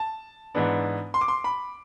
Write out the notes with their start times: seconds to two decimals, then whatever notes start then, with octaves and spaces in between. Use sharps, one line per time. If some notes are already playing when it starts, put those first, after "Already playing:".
Already playing: A5
0.54 G#2 E3 B3 D4
1.14 C6
1.21 D6
1.28 C6
1.44 B5